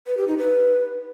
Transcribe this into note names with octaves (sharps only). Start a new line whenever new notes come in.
B4
G4
D#4
B4